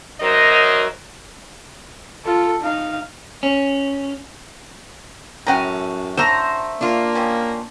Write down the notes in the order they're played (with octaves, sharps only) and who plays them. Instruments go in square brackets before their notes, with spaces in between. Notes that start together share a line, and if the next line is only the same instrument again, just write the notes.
[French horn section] F#2 F#3 D#4 A#4 C5 D#5
[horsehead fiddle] F4 A4
D#4 F5
[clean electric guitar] C#4
[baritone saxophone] F#2 [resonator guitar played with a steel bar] A2 C#4 [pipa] F#5 G5 A#5
[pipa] D3 A3 F#4 [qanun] C5 A#5
[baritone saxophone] A#3 [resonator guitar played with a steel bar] D4 F4
[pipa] F3 G3 C#4